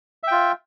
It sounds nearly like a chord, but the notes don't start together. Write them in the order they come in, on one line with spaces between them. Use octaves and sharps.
E5 G5 F4